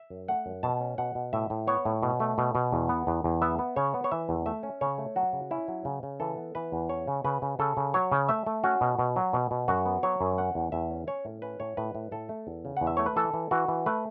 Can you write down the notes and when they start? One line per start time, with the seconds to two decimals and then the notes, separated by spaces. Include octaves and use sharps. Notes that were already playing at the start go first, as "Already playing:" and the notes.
Already playing: E5
0.10 F#2
0.28 A3 F#5
0.46 F#2
0.63 B2 A5
0.81 C#4
0.98 B2 F#5
1.15 B2
1.33 A2 E5
1.50 A2
1.67 B3 C#5
1.85 A2
2.03 B2
2.20 A3
2.38 B2
2.55 B2
2.73 E2
2.89 B3
3.07 E2
3.24 E2
3.42 B3 E5
3.59 B3
3.76 C#3 C#5
3.94 B3
4.04 C#5
4.12 E3 E5
4.29 E2
4.46 A3 E5
4.63 C#4
4.81 C#3 C#5
4.98 A3
5.16 F#3 F#4
5.33 C#3
5.51 C#4 E4
5.68 F#3
5.85 C#3
6.03 C#3
6.20 E3 A4
6.38 B3
6.55 E3 B4
6.72 E2
6.89 C#4 C#5
7.07 C#3
7.24 C#3 B4
7.42 C#3
7.59 C#3 A4
7.77 C#3
7.94 F#3 C#5
8.12 C#3
8.29 A3 E5
8.46 A3
8.64 C#4 F#4
8.81 B2
8.99 B2
9.16 F#3
9.33 B2
9.51 B2
9.68 F#2 F#4
9.86 B3
10.03 F#3 C#5
10.21 F#2
10.38 C#4 F#5
10.55 E2
10.72 E2 E5
10.91 C#4
11.07 C#4 C#5
11.25 A2
11.42 C#4 B4
11.60 A2 C#5
11.77 A2 B4
11.95 A2
12.12 A2 A4
12.29 A3
12.47 E2
12.65 C#3
12.77 E2 F#5
12.87 E5
12.97 A3 C#5
13.06 B4
13.16 E3 A4
13.34 E3
13.51 E3 F#4
13.68 E3
13.86 A3 B4